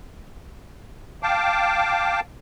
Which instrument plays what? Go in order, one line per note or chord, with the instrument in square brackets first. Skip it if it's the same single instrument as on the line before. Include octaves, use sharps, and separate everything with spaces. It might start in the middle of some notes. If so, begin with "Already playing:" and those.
[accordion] F5 G5 A5 D6